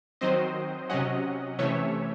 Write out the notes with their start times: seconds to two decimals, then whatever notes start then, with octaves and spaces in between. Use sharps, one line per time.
0.21 D#3 F#3 C4 C5 D#5
0.89 C3 F#3 C#4 D#5 F#5
1.59 C3 E3 A3 C#4 C#5 E5